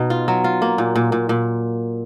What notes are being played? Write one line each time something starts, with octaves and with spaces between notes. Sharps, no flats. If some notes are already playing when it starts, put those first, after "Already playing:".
Already playing: B2 D#4
F4
F#3
F4
A#3
A#2
A#2
A#2
A#2